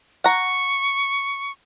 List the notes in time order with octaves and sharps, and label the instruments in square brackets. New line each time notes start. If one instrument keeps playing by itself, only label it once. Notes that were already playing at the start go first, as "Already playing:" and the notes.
[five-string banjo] F#5 A#5 [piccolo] C#6